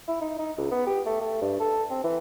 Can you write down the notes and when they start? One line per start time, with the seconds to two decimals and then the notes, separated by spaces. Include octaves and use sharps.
0.08 E4
0.21 D#4
0.39 D#4
0.58 C#2
0.71 B3
0.87 G4
1.06 A3
1.21 A3
1.42 G2
1.60 A4
1.91 C4
2.04 E3